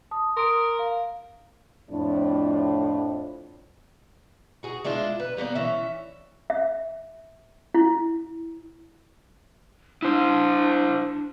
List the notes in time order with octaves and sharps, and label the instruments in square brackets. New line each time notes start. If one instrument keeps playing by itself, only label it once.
[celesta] A5 D#6
[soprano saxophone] A#4 [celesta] C6 D#6 D7
[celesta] F5
[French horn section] F2 A2 D4
[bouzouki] F#4 G#4
G#3 D4 E4 F4
B4
G3 A#3 B3 D4
E3 C#4 E5
[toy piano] E5
E4
[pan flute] D4 [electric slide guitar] E4 C5